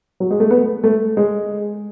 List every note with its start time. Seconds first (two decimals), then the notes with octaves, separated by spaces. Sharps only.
0.20 F#3
0.31 G#3
0.40 A3
0.50 B3
0.84 A3
1.17 G#3